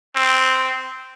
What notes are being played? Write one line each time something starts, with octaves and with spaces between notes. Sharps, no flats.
C4